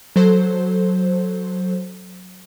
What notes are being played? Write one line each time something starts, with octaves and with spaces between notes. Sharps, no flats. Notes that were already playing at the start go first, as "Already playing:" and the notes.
F#3 A4 C5